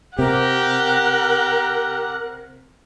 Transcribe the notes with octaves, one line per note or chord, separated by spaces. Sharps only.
C3 G4 A#4 F#5